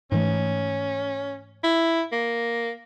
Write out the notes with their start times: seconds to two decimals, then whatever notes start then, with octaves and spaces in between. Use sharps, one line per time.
0.12 G#2 E3 A3 C#4
1.64 E4
2.13 A#3